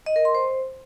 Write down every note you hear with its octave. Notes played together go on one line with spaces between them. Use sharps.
D#5
A#4
C6
C5